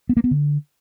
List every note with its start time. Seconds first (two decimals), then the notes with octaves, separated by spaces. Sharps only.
0.09 B3
0.17 A#3
0.24 B3
0.31 D3